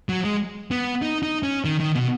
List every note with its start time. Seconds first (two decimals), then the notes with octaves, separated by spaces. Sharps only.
0.09 F#3
0.24 G#3
0.71 B3
1.02 D#4
1.23 D#4
1.43 C#4
1.65 D#3
1.80 D#3
1.95 B2